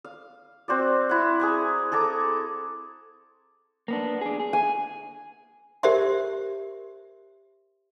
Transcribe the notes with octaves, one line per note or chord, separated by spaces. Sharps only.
F5
C4 F#4 D5
E4 F#5
G#4 G#5 A#5
G#4 A4 A#5 D6
A#3 B3 D4
D4 G#4
G#4
G#5
G4 A#4 C5 D5 E5 C6